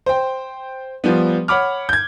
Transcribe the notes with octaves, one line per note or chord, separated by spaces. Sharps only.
C5 G5
F3 G3 B3
C#5 F#5 B5 D6 F6
G6 G#6